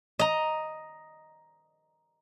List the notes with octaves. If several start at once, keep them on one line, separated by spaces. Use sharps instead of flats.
D#5 A#5